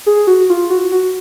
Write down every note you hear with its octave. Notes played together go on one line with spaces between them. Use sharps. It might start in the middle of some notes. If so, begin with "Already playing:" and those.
G#4
F#4
F4
F#4
F#4